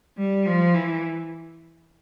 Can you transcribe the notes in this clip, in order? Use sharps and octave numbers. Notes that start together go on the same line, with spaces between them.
G3
F3
E3